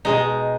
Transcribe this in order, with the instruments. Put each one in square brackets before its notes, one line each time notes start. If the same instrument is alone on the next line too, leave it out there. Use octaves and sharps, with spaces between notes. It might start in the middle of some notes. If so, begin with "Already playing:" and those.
[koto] B2 G#3 D#4